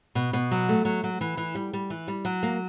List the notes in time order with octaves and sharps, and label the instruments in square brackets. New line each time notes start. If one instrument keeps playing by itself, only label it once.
[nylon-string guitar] B2
B2
F#3
A3
F#3
F#3
E3
E3
G3
G3
E3
G3
F#3
A#3